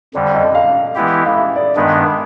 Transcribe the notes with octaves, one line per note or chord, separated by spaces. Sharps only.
F2 D3 G3 D5
D#5
F5
E3 G#3 B3 E4 G4
F5
E5
D5
G2 D#3 G#3 B3 D4 D#5